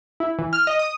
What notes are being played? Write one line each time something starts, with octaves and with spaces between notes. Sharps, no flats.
E4
E3
F6
D#5
D#6